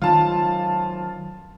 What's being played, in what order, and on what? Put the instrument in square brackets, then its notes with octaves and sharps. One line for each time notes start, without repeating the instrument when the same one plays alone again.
[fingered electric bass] D#3 F#3 [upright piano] F4 A5